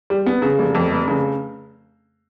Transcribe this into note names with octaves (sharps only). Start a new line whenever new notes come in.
G3
B3
C#3
F1
F2
F1
C#3